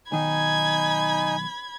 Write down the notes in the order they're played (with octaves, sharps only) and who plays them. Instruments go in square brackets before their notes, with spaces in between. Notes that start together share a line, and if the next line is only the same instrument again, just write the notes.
[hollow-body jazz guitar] B1 D#3 [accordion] D#4 G#5 [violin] B5 G#6